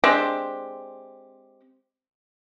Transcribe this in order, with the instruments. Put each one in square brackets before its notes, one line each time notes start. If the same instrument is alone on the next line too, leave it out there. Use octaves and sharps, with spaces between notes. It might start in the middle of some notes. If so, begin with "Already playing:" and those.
[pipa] G#3 C4 D4 G4